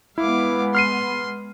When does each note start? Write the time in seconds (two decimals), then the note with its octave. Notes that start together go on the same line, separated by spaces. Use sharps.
0.18 G#3 B3 E4 F5 D6
0.75 C6 F6 C7 D#7